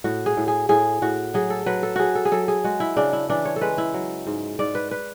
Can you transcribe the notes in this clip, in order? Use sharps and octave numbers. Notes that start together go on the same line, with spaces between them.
A2 F#4
G#4
A2
G#4
A2 G#4
A2 F#4
F#3 G#4
A4
F#3 B4
A4
F#3 F#4 G#4
A4
G#4
F#3 A4
G#4
G#3 F#4
E4
C#3 D4
E4
E3 D4
C#5
A4
G#3 B4
E4
F#3
G#2
G#2 D5
B4
B4